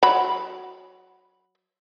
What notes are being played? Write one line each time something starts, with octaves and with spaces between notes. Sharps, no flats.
F#3 B5